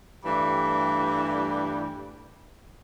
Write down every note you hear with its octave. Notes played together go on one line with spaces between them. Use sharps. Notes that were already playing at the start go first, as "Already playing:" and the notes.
G2 E3 G3 A3